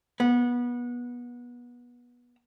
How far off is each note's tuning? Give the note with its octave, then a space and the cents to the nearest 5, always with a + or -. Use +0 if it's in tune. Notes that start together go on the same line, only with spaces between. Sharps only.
B3 -25